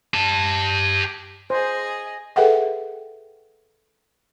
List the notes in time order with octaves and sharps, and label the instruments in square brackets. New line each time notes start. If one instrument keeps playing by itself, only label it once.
[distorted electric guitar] G4 A5
[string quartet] G#4 D#5 [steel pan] C5
[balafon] G#4 A4 B4 E5 F#5 G5